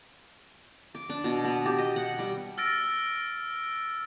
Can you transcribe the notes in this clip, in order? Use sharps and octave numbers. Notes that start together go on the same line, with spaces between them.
D6
D4
B2
B3
G4
D#5
F#5
G3
E6 F6 A6 A#6 D7